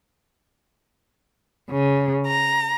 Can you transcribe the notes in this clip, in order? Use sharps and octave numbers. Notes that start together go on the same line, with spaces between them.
C#3
A#5